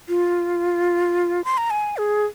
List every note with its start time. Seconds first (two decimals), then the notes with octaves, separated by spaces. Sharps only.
0.09 F4
1.44 C6
1.58 A#5
1.71 G#5
1.97 G#4